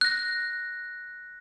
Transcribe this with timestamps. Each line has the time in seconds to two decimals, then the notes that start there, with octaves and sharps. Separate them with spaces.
0.01 F#6 A#6